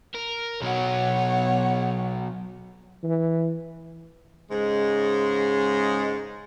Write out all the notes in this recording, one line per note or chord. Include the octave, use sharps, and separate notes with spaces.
A#4
B2 F#3 C#5 F#5
E3
G#2 C#3 G#3